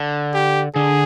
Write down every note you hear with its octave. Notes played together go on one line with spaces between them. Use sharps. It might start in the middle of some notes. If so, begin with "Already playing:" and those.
Already playing: D3
G4
D3 G#4